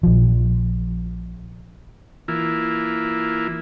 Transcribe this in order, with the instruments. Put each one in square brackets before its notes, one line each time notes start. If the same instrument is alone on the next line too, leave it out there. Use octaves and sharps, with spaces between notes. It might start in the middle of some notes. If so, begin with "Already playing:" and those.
[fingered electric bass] A#1 F3
[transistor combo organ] E3 A#3 E4 F4